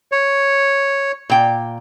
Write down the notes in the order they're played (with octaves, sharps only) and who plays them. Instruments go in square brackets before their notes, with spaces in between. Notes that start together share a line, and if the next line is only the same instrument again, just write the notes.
[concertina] C#5
[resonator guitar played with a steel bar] A#2 G5